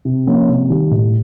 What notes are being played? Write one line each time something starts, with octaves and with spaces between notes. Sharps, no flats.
C3
F3 A#3 C#4
C3
D#3 G3
A2